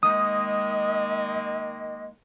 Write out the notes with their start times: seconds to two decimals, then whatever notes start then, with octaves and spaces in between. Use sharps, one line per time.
0.03 D#3 G#3 A#3 D#5 D#6